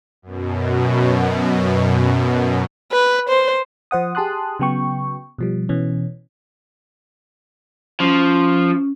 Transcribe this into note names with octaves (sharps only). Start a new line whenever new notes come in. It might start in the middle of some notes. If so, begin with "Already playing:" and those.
F#2 B2
B4
C5
F3 C5 F#5 D#6
G4 G#4 A5 C6 D#6 F#6
C#3 F#3 B3 G5 C#6
B2 F3 G3
B2 E3 C#4
F3 C#4